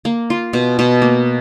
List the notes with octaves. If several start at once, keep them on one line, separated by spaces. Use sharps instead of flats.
A#3
F4
B2
B2
A#3